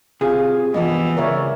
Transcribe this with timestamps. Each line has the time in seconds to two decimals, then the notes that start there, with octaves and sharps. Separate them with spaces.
0.21 C3 F4 G#4 D#6
0.74 G2 E3 F3 G3 B3 D#5
1.17 C#2 A#4 C#5 D5 E5